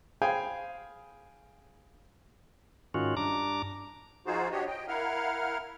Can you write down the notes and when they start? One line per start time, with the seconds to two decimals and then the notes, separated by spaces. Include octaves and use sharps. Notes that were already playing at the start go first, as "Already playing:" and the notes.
0.22 G#4 C5 F5 G5 G#5 B5
2.94 G#2 D#3 C#4 F4 F#4
3.17 G2 D4 A#5 D6
4.26 F3 D#4 F4 F#4 G#4 C5
4.51 D4 F#4 G4 C#5 D#5
4.67 D#5 G5
4.88 E4 A#4 F5 F#5 F6